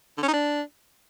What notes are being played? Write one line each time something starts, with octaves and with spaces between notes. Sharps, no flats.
D3
C#4
D#4
D4